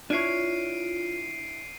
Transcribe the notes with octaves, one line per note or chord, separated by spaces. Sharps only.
D4 E4 F4 C#5 C7 D7 D#7